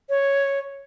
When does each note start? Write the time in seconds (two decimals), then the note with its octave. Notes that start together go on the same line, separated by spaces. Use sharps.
0.09 C#5